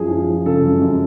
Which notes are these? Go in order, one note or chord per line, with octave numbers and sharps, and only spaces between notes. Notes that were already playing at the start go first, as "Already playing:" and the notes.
Already playing: F#2 F3 G#4
F3
F3
C#3 A4
F#2
F#2